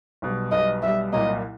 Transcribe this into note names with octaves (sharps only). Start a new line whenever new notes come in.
B1 B2 G3
B1 B2 G3 D#5
B1 B2 G3 E5
C2 A#2 F#3 A#3 D#5